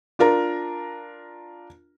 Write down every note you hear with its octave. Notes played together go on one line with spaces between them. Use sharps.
D4 F4 A#4 A#5